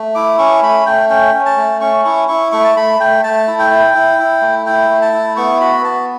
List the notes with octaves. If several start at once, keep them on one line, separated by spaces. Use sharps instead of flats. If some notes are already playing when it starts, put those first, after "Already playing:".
Already playing: A3
E4 D6
C#4 C#6
A3 B5
A3 G5
C#4 G5
C#4
A5
A3
C#4 C#6
E4 C#6
E4 C#6
A3 C#6
A5
A3 B5
A3 G5
A3 A5
E4
G5
E4
E4
E4
A3
E4 G5
A3
A5
E4
B3 C#6
F#4 B5
B3 A5